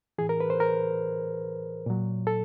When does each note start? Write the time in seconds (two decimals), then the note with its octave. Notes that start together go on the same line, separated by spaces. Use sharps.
0.18 A2 E3 G#4
0.29 A#4
0.40 B4
0.50 C5
0.60 A#4
1.86 A#2 F#3
2.27 A4